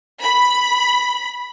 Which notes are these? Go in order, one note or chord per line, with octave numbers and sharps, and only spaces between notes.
B5